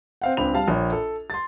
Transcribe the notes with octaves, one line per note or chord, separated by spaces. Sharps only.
C4 F5 F#5
C#2 C4 D4 B5 F7
G3 F5 A5
A#1 C#5
A4
C6 A6